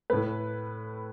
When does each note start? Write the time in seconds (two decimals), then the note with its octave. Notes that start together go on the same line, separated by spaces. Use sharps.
0.10 A2 A3 B4